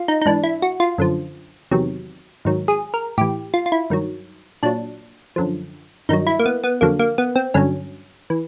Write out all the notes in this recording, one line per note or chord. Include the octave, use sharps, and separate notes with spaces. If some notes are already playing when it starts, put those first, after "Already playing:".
Already playing: F4
D#4
D#4
G#2 E3 D4
E4
F#4
F4
F#2 D3 F3
E2 C3 D#3 F#3
G#2 D#3 F#3
G#4
A#4
A2 E3 G4
F4
F4
E4
G2 D#3 F#3
A#2 F#3 D4
F#2 D3 F3
G2 D#3 F#3 D#4
E4
A#3
B3
B3
F2 D3 F#3 A#3
A#3
B3
C4
G2 D3 F#3 C#4
E3